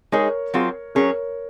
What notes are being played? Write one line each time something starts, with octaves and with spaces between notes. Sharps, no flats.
G#3 D#4 G#4 A#4 C#5
F#3 C4 F4 G#4
F#3 C#4 G#4 A#4 C#5